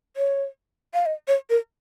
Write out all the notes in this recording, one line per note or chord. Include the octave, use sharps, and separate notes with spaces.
C#5
F5
D#5
C#5
A#4